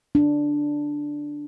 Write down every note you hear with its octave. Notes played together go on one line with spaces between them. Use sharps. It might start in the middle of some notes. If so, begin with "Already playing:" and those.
D4